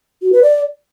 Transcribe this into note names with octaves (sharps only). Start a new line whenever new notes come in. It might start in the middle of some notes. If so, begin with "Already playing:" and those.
F#4
B4
D5